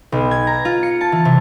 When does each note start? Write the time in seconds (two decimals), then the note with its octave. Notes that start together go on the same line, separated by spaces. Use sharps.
0.12 B1
0.31 G#6
0.47 A#5
0.65 F4
0.83 C#7
1.01 A5
1.12 E3
1.25 C3